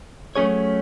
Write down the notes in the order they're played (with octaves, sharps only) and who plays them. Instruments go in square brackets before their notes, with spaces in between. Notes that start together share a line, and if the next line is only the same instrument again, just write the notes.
[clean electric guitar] F#3 A3 C#4 G#4 C#5